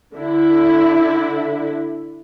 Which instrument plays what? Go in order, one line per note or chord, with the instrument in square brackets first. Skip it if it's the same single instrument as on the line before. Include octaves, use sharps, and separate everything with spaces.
[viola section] D3 E4